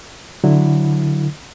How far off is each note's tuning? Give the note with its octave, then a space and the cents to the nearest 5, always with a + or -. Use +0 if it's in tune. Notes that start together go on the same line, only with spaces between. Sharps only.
D3 +0 F#3 -5 E4 +0